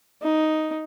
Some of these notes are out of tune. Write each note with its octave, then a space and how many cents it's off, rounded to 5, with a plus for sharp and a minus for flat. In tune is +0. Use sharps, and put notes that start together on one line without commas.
D#4 +5